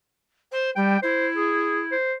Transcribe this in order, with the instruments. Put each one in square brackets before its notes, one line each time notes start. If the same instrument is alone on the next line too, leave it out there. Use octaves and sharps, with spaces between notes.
[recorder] C5
[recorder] G3 [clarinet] G5
[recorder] E4 [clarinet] C5
[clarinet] G#4
C5